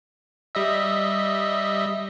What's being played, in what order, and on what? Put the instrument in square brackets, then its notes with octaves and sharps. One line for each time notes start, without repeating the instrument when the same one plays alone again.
[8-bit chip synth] G3 D#5 E5